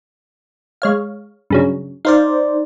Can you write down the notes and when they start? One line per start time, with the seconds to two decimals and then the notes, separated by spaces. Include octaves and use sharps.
0.82 G#3 C#5 F5
1.50 G2 C#3 F#3
2.05 D#4 C5 D5 F5